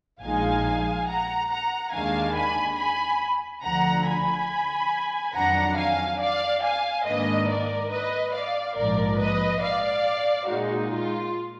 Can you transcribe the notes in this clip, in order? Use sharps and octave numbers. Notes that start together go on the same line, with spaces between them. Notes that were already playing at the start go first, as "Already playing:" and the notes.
A#1 A#2 F3 G#3 D#4 F5 G#5
F#5 A#5
F#5 A#5
D#2 D#3 G#3 D4 F5 G#5
G#5 B5
G#5 B5
D2 D3 F3 F#5 A#5
G#5 B5
F2 D#3 F#3 D4 F#5 A#5
F5 G#5
D5 F5
F5 G#5
G#2 D#3 A#3 D4 B4 D#5
A#4 D5
B4 D#5
D5 F5
A#1 G#2 F3 A#4 D5
B4 D#5
D5 F5
A#2 G#3 D#4 F#4
F4